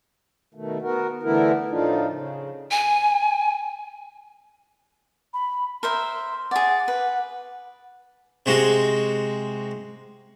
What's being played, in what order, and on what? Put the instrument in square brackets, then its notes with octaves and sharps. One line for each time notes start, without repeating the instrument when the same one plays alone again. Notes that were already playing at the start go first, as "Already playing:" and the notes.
[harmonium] B2 D#3 A3
B3 F#4 A#4
D3 E3 A3 B3 E4 A#4
A2 F3 A3 D4 D#4 F4
C#3
[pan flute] G#5
[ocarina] B5
[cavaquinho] A#4 C5 E5 [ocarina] C6
[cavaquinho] G#4 D5 [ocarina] F#5
[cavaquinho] B4
[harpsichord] C3 G#3 F#4